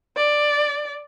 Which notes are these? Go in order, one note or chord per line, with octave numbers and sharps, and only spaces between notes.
D5